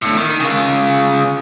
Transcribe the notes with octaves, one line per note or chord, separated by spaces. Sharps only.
A2 D3
D#3
C#3 F4